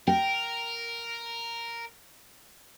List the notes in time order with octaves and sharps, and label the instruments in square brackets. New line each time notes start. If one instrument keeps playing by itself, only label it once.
[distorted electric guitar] A#4 [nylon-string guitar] G5